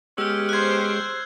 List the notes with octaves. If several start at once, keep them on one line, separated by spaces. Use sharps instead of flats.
G#3 B3 C#4 G4 E6 F6
C5 C6 F#6 G#6